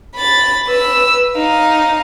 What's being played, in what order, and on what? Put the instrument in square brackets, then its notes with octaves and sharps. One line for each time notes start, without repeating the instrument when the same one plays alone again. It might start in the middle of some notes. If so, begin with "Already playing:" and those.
[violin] B5 A6
B4 E6
D#4 F5